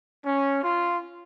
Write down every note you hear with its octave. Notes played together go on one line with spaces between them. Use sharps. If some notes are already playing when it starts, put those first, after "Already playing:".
C#4
F4